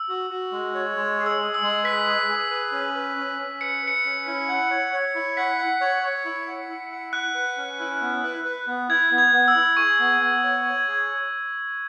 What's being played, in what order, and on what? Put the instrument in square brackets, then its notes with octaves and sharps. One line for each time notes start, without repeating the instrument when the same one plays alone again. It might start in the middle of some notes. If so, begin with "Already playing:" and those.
Already playing: [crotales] E6
[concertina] F#4
F#4
G#3
C#5
G#3
G#4
[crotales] E6
[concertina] G#4
[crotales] E6
[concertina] G#3
[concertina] B4 [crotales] B6
[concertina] G#4
G#4
B4
C#4
B4
C#4
C#4
[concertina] B4 [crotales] C#7
[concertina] B4 [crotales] C#7
[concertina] C#4
E4
F#5
C#5
C#5
E4
[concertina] F#5 [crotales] B6
[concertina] F#5
C#5
C#5
E4
F#5
E4
F#5
[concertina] F#5 [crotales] F#6
[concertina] B4
C#4
E4
B3
B4
B4
B3
[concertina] E4 [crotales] G#6
[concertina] B3
[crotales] G#6
[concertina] B3
[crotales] E6
[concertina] E4
[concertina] G#4 [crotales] C#6
[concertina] B3
B3
C#5
C#5
G#4